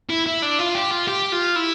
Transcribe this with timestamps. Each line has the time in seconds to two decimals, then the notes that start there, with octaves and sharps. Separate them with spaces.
0.09 E4
0.26 E4
0.42 D4
0.59 F4
0.75 G4
0.91 F4
1.07 G4
1.32 F4
1.56 E4